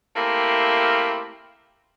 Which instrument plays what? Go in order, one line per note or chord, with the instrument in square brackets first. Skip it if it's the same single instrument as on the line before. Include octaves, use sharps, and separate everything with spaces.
[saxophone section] A3 A#3 C4 E4 G4 A#4